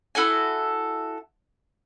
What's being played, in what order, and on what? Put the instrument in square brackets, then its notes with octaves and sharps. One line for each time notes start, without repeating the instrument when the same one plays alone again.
[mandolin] E4 F#4 A4 G#5